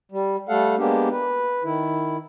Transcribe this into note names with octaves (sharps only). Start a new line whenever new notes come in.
G3
G3 A3 A4 F5 F#5
G#3 A#3 B3 D4 G4
B4
D#3 E4